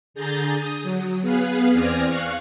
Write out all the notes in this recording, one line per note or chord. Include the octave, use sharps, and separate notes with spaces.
D3 G#4 A#5 G6 A6
D#6
F#3
B3 G#4 B4 F5
E2 C4 D5 G#5 F6 A#6
F5 C#6 F#6